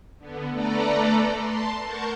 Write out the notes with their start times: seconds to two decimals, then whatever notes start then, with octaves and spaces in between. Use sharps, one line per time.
0.18 D3 B3
0.50 A3 A4 B4 D5 A#5
1.38 A5 C6
1.85 A#4 F#5 A5 C#6 G6